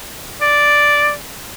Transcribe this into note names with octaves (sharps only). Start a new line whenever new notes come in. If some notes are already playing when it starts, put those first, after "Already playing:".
D5